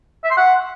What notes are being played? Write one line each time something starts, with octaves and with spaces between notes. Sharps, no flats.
E5
C6
F#5